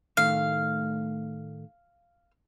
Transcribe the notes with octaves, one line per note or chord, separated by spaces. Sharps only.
A2 D#3 A3 F5